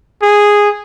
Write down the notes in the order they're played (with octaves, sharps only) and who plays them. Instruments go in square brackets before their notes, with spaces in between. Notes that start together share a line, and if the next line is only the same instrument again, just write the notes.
[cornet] G#4